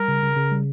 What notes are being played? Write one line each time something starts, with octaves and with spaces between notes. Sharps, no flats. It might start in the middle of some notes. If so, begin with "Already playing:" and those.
Already playing: G3 A#4
C#3
C#3
C#3
G3